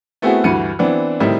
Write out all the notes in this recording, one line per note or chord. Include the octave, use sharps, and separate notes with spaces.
A3 B3 C4 E4 F#4 G#4
D2 G2 E3 F#4 C#7 D#7
E3 B3 C4 D4
A2 D#3 G3 C4 D#4 E4